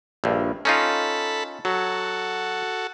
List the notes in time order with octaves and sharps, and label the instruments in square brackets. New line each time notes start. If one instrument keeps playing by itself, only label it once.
[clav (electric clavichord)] A#1 G2
[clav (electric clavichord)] C#4 D#4 F4 [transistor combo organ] A4 B5
[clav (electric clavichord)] F#3 [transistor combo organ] F#4 A4